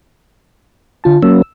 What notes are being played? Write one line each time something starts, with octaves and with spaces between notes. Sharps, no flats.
D3 F4 A5
F#3 A#3 C#4 E6